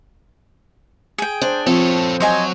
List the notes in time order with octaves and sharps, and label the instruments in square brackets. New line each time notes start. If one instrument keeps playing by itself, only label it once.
[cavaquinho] G#4 G5
[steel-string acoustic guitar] D4 [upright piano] C5
[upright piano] F3 [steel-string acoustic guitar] C4 [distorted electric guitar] A4 C#5
[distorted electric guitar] F#3 [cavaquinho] C5 D#5 G#5